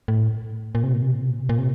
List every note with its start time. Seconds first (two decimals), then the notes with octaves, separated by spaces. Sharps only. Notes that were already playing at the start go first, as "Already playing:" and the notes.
0.08 A2
0.75 A#2
0.84 C3
0.93 A#2
1.02 C3
1.12 A#2
1.21 C3
1.30 A#2
1.40 C3
1.49 A#2
1.59 C3